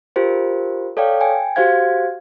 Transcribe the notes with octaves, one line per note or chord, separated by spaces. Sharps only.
F4 G4 A#4 C5
A4 C#5 D5 F5 G5
G5 G#5
F#4 G4 C5 F5 G#6